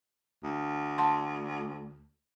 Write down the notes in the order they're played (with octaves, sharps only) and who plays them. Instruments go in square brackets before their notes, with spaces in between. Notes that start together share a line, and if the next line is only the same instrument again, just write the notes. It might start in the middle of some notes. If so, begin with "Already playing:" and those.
[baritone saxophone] D2
[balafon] F#5 A5 C6